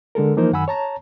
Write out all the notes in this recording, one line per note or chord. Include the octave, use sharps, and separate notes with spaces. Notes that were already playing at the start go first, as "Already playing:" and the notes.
D3 G#3 A4 A#4
E3 F3 A#3 D#4 A#4 C5
F#2 D#3 F#5 G#5 B5 E6
C#5 A5 A#5